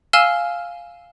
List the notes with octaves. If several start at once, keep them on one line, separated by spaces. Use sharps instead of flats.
F5 G#5 E6 F6 E7 G7